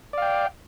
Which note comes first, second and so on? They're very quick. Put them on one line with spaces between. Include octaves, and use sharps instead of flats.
D5 F5 G5